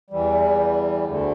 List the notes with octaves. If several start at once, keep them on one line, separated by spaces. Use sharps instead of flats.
E2 E3 G3
D2 D3 A3